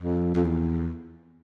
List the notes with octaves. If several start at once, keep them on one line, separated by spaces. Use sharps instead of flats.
F2
F2
E2